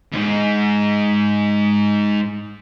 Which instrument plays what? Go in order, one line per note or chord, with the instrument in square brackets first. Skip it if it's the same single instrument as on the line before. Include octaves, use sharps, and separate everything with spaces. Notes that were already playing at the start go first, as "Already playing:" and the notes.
[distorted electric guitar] D#2 G#2